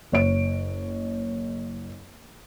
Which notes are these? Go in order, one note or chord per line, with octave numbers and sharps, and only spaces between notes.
F#1 C#5 D7